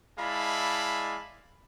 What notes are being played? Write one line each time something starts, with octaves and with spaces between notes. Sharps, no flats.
G#3 E4 D5 F5 A5 B5